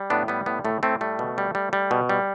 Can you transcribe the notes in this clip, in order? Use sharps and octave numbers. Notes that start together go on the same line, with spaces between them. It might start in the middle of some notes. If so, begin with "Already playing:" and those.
Already playing: G3
A2 B3 D4
G3 B3
A2 B3
A2 A3
A2 A3 C4
G3 A3
B2
G3
G3
G3
B2
G3